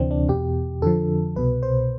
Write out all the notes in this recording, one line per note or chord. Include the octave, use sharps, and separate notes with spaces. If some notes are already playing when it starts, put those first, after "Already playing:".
Already playing: D2 C3 E3 C4 D4
D4
E2 B2 G4
F2 D3 F3 A4
C2 B2 B4
C5